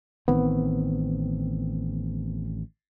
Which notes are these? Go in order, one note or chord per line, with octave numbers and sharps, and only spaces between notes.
A1 D#3 B3 C4